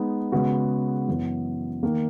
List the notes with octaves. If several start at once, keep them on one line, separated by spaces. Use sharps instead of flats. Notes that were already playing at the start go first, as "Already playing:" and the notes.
Already playing: G#3 B3 D#4
C#3 G#3 B3 F#4
F#2 E3 B3
D#3 A#3